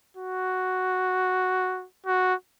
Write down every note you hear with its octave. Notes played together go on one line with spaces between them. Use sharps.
F#4
F#4